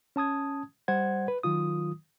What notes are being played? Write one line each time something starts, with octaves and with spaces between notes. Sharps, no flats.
C#4 A5 D#6 G#6
G3 C5 F#5 G#6
B4
D#3 F#3 F4 D#6